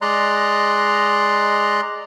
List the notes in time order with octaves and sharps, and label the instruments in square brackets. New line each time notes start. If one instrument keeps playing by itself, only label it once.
[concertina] G#3 D5 D#5 A#5 C6 F#6